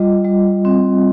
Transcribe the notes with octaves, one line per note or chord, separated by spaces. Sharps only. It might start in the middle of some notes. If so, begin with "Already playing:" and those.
Already playing: G3 F4 D#5
G3
C4